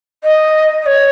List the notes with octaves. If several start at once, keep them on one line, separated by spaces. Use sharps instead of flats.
D#5
D#5
C#5